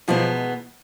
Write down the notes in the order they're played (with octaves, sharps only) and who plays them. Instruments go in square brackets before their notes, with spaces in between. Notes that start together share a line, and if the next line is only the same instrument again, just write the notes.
[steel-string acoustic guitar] E2 B2 G#3 B3 [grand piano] F3